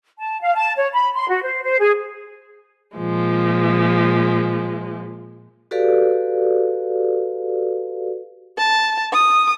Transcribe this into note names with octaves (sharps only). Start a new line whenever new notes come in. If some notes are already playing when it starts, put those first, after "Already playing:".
A5
F5
A5
C#5
B5
C6
F#4
C5
C5
G#4
A#2 F3 G#3
F#4 G4 A4 B4 D5 F5
A5
D#6